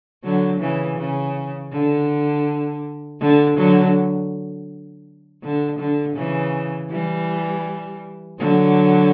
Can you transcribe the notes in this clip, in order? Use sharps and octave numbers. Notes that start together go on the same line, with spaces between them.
D3 F#3
C#3 E3
C#3
D3
D3
D3 F#3
D3
D3
C#3 E3
E3 G3
D3 F#3